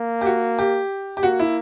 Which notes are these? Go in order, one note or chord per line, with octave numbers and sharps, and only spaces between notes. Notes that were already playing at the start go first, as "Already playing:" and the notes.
Already playing: A#3
G4
F#4
G4
G4
A#3 F#4
E4